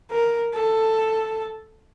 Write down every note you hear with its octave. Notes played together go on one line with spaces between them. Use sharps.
A#4
A4